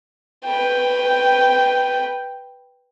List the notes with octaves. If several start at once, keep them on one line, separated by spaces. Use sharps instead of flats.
B4 G5